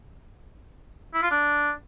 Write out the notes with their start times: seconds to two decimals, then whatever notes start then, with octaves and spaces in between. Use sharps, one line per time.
1.14 E4
1.22 F4
1.31 D4